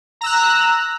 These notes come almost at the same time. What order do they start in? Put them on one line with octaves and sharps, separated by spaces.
A#5 E6 F#6